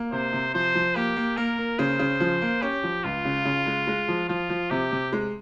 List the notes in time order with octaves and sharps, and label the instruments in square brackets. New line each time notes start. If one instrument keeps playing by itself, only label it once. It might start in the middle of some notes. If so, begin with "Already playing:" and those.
Already playing: [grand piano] A#3
[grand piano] C3 [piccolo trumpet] C5
[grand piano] C3
[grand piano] F3 [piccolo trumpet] C5
[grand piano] F3
[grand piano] A#3 [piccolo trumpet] G4
[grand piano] A#3
[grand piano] A#3 [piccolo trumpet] A#4
[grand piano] A#3
[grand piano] C#3 [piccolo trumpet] C5
[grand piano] C#3
F3
A#3
[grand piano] C#4 [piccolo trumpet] G4
[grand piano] F3
[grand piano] C#2 [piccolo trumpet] F4
[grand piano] C#3
C#3
G#3
G#3
F3
[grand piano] F3 [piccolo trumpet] F4
[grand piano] F3
[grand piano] C3 [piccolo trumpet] G4
[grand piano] C3
G#3